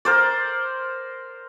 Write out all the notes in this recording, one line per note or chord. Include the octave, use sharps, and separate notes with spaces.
A#4 C5 D5